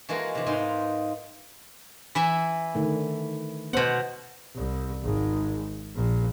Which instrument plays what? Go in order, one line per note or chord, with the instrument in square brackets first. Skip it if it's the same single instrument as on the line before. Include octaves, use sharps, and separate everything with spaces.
[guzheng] E3 G#3 A#3 F#4 A4 A#4
C3 E3
G#2 A#3 B3 D#4 F4
E3 E4 E5
[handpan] D3 D#3 A3
[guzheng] B2 F#5 [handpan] B3 C5
[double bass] C2
G#1 G#2
A#1 A#2